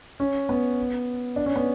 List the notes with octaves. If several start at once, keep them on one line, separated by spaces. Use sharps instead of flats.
C#4
B3
D4
C#4
B3